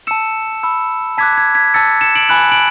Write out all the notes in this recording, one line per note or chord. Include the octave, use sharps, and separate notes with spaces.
A5 E6 C#7 E7
B5 E6
A5 D6 F#6 G#6 B6
G#6
G#6 B6
A5 E6 A6 C#7
C#7 E7
D7 F#7
G#5 B5 F#6 F#7
D7 F#7